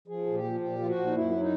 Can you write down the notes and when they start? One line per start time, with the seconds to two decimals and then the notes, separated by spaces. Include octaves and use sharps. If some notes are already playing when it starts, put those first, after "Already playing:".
0.08 F3 G#4
0.26 A#2
0.34 G4
0.44 F3
0.60 A#2 G4
0.79 F3 F4
0.88 F#4
0.95 A#2
1.06 D#4
1.13 F#2 E4
1.31 F#3
1.40 D#4